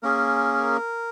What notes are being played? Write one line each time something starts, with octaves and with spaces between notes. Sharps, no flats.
A#3 C#4 G#4 A#4